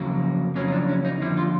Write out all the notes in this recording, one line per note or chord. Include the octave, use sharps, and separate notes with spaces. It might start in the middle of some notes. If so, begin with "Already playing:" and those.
Already playing: F2 C#3 F#3 A#3
F2 C#3 F#3 A#3 C#4
D#4
D4
C#4
D#4
F2 D3 G3 A#3 E4
F4